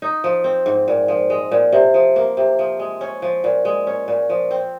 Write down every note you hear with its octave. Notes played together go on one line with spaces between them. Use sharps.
D#4
F3
C4
G#2
A#2
F3
G#3
A#2
C3
F3
A#3
C3
F3
G#3
C#4
F3
A#2
G#3
C#4
A#2
F3
C4